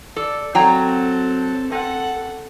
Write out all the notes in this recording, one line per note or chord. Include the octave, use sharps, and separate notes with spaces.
A4 D5
F#3 C4 A4 G5 A#5
C4 A4 F#5